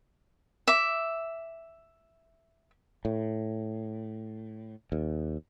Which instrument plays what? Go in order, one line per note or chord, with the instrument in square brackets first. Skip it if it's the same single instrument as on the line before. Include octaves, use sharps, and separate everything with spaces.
[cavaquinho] E5 D6
[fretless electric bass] A2
D#2